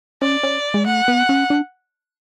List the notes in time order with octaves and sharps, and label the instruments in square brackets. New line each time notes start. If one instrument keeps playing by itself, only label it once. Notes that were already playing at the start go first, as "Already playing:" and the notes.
[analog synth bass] C#4 [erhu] D5
[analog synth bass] C#4
G#3
[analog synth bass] A3 [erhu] F#5
[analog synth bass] B3
C#4
D4